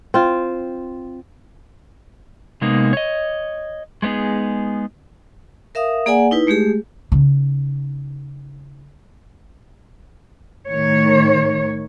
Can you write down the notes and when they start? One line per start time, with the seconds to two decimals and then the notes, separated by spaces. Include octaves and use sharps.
0.14 C4 F4
2.61 C3 G#3 A#3 B3 D#4
2.93 C#5 D#5
4.02 G#3 A3 B3 D#4 G#4
5.75 A#4 E5 F5 D#6
6.06 A#3 G#4 D5 F#5 G#5
6.31 D#4 E4 B4
6.47 G#3 A3 G4 G#4
7.12 C#3 D#4
10.68 A2 D#3 C#5